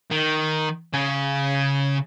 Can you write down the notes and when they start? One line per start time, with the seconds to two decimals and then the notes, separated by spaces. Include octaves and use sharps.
0.11 D#3
0.94 C#3 C#4